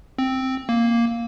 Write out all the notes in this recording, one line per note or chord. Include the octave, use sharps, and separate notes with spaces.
C4
A#3